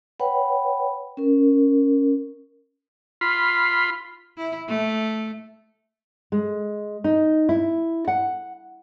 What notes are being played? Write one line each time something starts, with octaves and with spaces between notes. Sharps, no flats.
B4 C#5 F#5 G5 B5
C#4 A#4
F4 B5 C6
E4
A3
G#3
D#4
E4
F#5